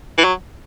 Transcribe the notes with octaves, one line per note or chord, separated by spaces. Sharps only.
E3
F#3